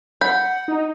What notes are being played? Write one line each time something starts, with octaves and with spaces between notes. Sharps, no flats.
F#5 B5 G6
D#4